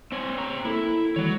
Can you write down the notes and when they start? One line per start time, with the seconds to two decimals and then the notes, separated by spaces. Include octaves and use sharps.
0.12 C4 C#5
0.37 C4 A#5
0.65 A#3 E4 A4
1.16 D#3 E3 G#3 F#4 C#5